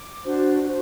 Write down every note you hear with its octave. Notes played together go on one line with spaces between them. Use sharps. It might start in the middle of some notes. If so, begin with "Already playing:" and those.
Already playing: D6
D4 F#4 C5
F#4 C5